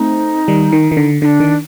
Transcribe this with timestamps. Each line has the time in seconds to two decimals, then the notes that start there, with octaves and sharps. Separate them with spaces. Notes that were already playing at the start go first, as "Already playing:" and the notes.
Already playing: A3 C4 D#4
0.48 D#3 G3
0.72 D#3
0.92 D#3
0.97 D3
1.22 D3 D4 D#4
1.40 D#3